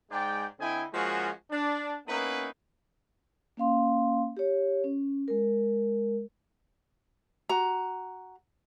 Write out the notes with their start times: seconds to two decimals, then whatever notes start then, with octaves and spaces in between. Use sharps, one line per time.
0.11 G#2 G#3 D5 G5
0.60 D3 C4 E4 D#5 G5 G#5
0.93 F3 G#3 A#3 C#4 F#4
1.51 D4
2.08 A#3 B3 C#4 D#4 E4 B4
3.57 A#3 C#4 F5 C6
4.37 G4 C#5
4.84 C#4
5.28 G#3 A#4
7.49 F#4 A#5